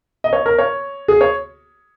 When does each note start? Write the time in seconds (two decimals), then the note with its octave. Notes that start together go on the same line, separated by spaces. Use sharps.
0.24 D#5
0.33 C#5
0.46 A#4
0.58 C#5
1.08 G#4
1.21 C#5